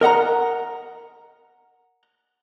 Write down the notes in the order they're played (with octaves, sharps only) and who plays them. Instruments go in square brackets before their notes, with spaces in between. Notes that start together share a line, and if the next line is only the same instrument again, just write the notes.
[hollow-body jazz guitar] A#4 D#5 F#5 A#5